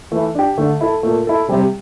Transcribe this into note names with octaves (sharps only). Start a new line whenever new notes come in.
E3 A3
D4 G4
D3 A3
E4 A4
A#2 A3
E4 A4
C3 G3